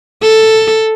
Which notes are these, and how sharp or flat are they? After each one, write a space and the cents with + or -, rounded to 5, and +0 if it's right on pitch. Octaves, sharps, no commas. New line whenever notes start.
A4 +5